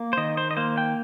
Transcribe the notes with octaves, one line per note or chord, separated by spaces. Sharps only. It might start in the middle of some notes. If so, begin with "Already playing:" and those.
Already playing: A#3
C5
D#3 D#5
C5
D#5
A#3 C5
G5